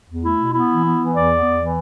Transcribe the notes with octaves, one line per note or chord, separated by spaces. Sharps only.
E2
A3 E4
B2
B3 E4
E3
B3
E3
E2 D5
B3
E2
E3